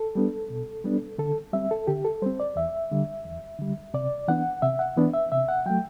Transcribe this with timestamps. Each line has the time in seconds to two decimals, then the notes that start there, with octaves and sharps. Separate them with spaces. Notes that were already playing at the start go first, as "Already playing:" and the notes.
Already playing: A4
0.15 G3 B3 D4
0.50 B2
0.84 G3 B3 D4
1.18 D3 A4
1.53 G3 C4 E5
1.71 A4
1.87 D3 G4
2.05 A4
2.22 G3 C4 C5
2.40 D5
2.56 E2 E5
2.91 D3 G3
3.24 E2
3.59 D3 G3
3.94 C3 D5
4.28 E3 B3 D4 F#5
4.62 C3 E5
4.79 F#5
4.96 E3 B3 D4
5.14 E5
5.32 C3 E5
5.48 F#5
5.66 F#3 A3 G5